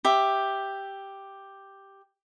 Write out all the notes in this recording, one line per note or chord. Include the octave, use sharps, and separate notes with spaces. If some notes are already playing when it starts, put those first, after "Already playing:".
G4 E5